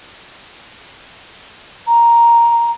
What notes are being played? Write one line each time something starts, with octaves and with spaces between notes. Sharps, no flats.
A#5